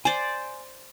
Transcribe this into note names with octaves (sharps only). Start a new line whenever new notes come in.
C5 D5 G#5